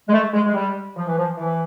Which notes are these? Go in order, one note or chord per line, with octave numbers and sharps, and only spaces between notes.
G#3
A3
G#3
G#3
G3
F3
E3
F3
E3